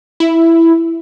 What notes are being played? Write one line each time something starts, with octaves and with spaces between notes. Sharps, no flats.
E4